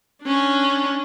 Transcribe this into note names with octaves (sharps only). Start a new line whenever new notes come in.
C#4 D4